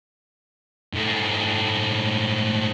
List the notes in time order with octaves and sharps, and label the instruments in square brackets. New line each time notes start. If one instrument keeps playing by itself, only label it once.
[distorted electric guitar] G#2 A3